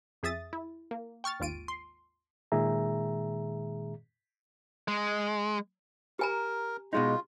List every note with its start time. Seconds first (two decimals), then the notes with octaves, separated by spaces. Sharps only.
0.23 F2 G#4 E5 D#6 A6
0.53 E4
0.91 A#3
1.24 G5 C#6 F6 A6
1.40 G#1 D#2 F4 D7 D#7
1.68 C6
2.52 A#2 D#3 G#3 G#4 E5 A#5
4.88 G#3
6.19 G4 A#4 G#5 A#5
6.93 B2 G#3 D#4 F4